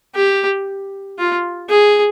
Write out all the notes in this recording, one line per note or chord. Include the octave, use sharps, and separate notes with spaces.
G4
F4
G#4